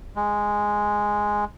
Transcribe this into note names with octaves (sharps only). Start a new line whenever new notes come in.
G#3